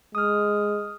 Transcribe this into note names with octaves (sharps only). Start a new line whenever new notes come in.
G#3 D#6 F6